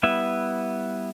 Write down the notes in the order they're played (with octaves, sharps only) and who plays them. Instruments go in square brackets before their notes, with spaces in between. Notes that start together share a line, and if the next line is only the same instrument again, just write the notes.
[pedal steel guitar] G3 B3 E4 E5